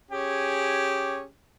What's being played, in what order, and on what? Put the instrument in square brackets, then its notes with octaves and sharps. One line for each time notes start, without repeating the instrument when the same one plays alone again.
[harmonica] C#4 G4 G#4